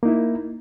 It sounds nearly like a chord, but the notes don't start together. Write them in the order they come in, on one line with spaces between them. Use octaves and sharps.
A#3 D#4 E4